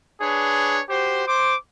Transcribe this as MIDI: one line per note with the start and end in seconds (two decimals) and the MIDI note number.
0.21 0.80 62
0.21 0.80 68
0.21 0.80 71
0.21 0.80 73
0.89 1.23 66
0.89 1.23 67
0.89 1.23 72
1.27 1.55 72
1.27 1.55 86